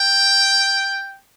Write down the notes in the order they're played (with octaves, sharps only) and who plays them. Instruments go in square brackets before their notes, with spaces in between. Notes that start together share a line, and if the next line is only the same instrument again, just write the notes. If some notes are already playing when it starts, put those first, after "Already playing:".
Already playing: [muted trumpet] G5